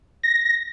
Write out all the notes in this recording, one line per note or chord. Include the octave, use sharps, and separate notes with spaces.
A#6